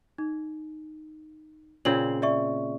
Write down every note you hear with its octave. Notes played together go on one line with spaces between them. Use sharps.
D#4
A#2 C#3 C4 F#7
D5 E5 C#6